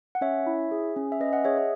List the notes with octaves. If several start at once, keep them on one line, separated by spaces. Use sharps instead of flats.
F#5
C#4 C#5 E5
E4
G#4
C#4
E5
C#4 B4 D#5
D#5 F#5
G#4 C#5 E5
C#5 E5